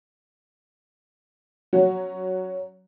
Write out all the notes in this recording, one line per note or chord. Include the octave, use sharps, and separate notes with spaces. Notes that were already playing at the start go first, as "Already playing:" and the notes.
F#3 C#4 F#4